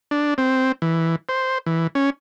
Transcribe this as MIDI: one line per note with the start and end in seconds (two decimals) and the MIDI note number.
0.11 0.34 62
0.38 0.72 60
0.82 1.16 52
1.29 1.58 72
1.66 1.87 52
1.95 2.10 61